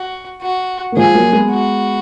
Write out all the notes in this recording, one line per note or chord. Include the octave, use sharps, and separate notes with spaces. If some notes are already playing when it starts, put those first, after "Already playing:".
Already playing: F#4
F#4
A#3
F3 G#3 G#4
F#3 A#3
G#3 B3
F#4